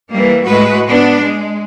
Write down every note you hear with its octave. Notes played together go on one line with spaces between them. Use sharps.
E3 G3 A#3
A2 G#3 F#4 B4
B3 D4
G#3